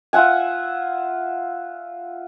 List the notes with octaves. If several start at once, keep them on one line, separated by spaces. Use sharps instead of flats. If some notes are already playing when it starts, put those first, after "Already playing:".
F4 E5 F#5 G#5